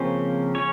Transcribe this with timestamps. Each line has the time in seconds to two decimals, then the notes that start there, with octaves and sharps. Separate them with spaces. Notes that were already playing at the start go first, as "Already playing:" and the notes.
Already playing: C#3 F3 A#3 C4 C#4 C5
0.55 C#4 C#5